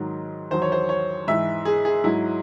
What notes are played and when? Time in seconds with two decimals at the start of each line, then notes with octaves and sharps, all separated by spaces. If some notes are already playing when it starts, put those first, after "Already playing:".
Already playing: G#2 D#3 F#3
0.51 E2 D#3 F#3 C5
0.62 C#5
0.72 C5
0.89 C#5
1.28 G#2 E3 E5
1.65 G#4
1.85 G#4
2.04 G#2 F#3 E4